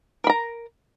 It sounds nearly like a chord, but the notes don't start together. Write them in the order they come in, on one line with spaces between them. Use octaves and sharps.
A#4 B5 A#5